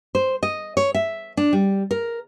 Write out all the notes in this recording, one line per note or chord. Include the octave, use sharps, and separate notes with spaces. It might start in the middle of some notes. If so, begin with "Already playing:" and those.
C5
D#5
C#5
E5
D4
G3
A#4